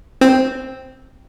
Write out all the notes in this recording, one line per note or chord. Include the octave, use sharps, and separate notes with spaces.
C4